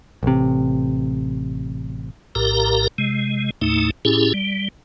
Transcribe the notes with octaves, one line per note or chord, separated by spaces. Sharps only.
A1 C3
A#1 A2 G4 A#4 A#5
C3 G#3
D#2 A2 A3 D#4
A2 C#4 E4 G4 G#4
G3